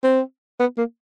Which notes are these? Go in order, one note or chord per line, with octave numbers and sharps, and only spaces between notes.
C4
B3
A#3